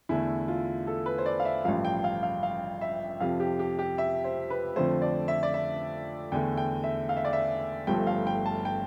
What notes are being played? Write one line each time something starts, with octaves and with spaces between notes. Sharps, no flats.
E2 D3 A3 E4
F4
A4
B4
C5
D5
F5
E5
A1 G2 F3 F5
G5
F5
F5
F5
E5
F2 C3 F3 F5
G4
G4
G4
E5
C5
B4
F2 D3 F3 A3 C5
D5
E5
D5
E5
E2 D3 A3 G5
G5
E5
F5
E5
D5
E5
G1 G2 F3 A3 G5
F5
G5
A5
G5